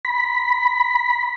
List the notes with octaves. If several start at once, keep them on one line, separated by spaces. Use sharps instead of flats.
B5